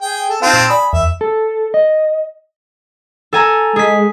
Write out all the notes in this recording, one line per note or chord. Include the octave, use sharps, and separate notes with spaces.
G#4 G5
A4
C4 D#4 F4 F5 A5
A#2
D5 G#5 B5 D#6
E2 E5
A4
D#5
A4 G#5 A#5
G#3 G#4 B6